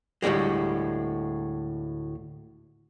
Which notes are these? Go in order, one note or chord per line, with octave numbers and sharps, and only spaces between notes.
D2 A2 C#3 G3 G#3